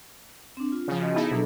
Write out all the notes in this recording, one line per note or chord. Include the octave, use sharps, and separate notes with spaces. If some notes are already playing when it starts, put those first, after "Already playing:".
C4 D4
F4
C#3 F3
F#4 D#5
B3 D#4 E4 G#4 A4
B2 F#3 D4 A4